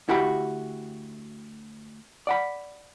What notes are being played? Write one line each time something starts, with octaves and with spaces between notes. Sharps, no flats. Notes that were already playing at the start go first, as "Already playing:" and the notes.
D2 E4 F#4 G4 B5
D5 F#5 B5